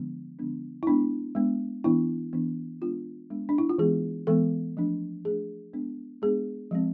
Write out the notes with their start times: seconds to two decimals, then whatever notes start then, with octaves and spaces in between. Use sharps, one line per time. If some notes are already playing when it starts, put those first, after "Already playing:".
Already playing: D3 F3 G#3 B3 D4
0.39 D3 F3 G#3 B3 D4
0.83 E4
0.87 G#3 B3 D4
1.35 G#3 B3 D4
1.84 E3 B3 D4 E4
2.33 E3 B3 D4
2.82 G#3 B3 D4 F4
3.30 G#3 B3 D4
3.49 D4
3.58 E4
3.69 F4
3.78 E3 G#3 B3 G#4
4.27 E3 G#3 B3 A4
4.77 F3 A3 D4
5.25 F3 A3 D4 G#4
5.73 G#3 B3 D4
6.22 G#3 B3 D4 G#4
6.71 F3 G#3 C4